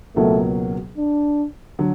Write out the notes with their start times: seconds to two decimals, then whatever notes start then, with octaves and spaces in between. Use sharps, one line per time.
0.16 C#2 B2 F#3 A3 A#3
0.97 D4
1.79 D3 F#3